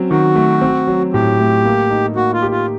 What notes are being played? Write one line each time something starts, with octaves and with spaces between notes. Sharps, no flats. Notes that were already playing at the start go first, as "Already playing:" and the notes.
Already playing: F#3 C4 C#4
D#3 F#4
A3
C4
F#3
A2 G4
A3
A#3
D#4
A#3 F#4
F4
G4
F4